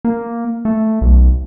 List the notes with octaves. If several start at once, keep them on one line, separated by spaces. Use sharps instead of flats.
A#3
A3
B1